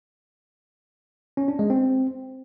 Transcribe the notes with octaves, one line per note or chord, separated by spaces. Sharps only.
C#4
D4
G#3
C4